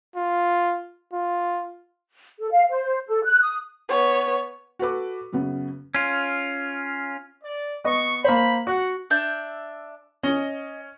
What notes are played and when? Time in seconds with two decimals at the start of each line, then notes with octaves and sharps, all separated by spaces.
0.16 F4
1.13 F4
2.40 A4
2.52 F5
2.70 C5
3.08 A4
3.24 F#6
3.42 D#6
3.89 B3 C#5
4.79 F#4 A4 B4 D6
5.33 F#2 C#3 B3
5.94 C#4 F4
7.43 D5
7.84 B3 D#5 C#6
8.24 A#3 C5 B5
8.67 F#4 F#5
9.10 D4 E5 G6
10.23 C#4 D#5